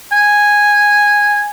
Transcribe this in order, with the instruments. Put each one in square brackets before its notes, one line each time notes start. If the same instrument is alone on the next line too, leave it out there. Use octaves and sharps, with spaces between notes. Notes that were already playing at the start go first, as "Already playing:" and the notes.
[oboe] G#5